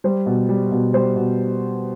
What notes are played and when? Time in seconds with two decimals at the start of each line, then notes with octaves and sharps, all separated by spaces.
0.04 G3 C5
0.26 B2
0.49 G3
0.72 B2
0.93 G3 C5
1.16 B2